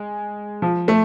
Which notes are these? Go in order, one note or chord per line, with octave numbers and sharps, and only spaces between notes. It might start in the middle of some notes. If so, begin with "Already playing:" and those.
Already playing: G#3
F3
A3